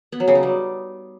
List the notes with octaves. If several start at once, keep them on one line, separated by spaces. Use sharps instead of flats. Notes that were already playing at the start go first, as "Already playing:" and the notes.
B3
F#3
C#3
D#4
G3